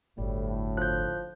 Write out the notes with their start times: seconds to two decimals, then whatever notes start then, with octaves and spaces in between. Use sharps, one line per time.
0.18 G1 D2 A2 G3
0.77 F3 F#6 G6